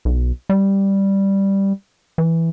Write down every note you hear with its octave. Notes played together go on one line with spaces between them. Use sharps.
B1
G3
E3